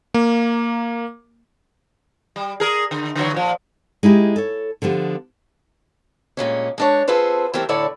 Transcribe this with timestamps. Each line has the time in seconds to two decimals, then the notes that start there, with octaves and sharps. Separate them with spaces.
0.14 A#3
2.36 G3
2.60 G#4 A#4
2.91 D3
3.15 D3 E3 F#3
3.34 A#2 F3
4.03 G#3 D#4 E4 G4
4.36 A4 C#5
4.82 D3 F3 B3 G4
6.37 G2 A#2 G#3 C#4
6.78 G#3 D4 C#5
7.08 C4 F4 G#4 A4 B4 C5
7.54 E3 G3 A3 C4 G4 A#4
7.69 A2 D3 E4 A4 C#5 D5